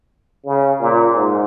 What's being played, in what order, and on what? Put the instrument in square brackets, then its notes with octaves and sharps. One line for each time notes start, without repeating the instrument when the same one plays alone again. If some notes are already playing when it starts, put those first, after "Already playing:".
[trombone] C#3
A#2
G#2